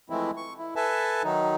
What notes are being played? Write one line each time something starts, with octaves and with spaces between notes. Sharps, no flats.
E3 F3 G#3 A3 C4 E4
C#6
E4
A4 B4 E5 G#5 A5
D#3 F#3 D#4